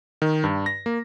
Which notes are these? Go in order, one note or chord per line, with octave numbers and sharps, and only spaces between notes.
D#3
G2
A#6
A#3